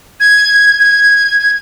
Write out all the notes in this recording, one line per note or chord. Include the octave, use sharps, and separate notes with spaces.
G#6
G#6
G#6